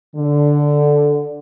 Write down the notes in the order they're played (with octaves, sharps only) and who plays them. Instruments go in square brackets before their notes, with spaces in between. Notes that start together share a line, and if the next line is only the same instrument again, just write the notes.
[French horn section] D3